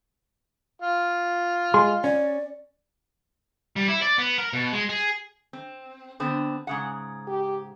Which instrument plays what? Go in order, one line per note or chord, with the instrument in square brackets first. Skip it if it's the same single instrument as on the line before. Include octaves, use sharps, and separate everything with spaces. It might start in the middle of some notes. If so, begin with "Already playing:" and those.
[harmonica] F4
[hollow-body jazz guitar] G#3 G#4 [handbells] C6
[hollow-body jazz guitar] C#4 [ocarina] D5
[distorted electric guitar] G3
E4
D5
B3
A#4
B2
G#3
G#4
[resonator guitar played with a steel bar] C4
D3 B3 C4
G#2 C#3 F#5
[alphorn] G4